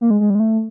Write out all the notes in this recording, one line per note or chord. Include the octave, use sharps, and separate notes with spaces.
A#3
G#3
G#3
G3
G#3
A3